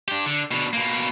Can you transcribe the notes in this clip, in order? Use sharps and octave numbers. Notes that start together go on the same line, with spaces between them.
D4 G4
D3
B2 D3
B2 A#3